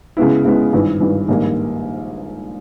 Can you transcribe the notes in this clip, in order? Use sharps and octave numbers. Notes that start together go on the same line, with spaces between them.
C#3 G#3 B3 E4
C#3 G#3 B3 E4
G#1 G2 E3
G#1 G2 E3
A#1 G#2 D#3 G3 A#3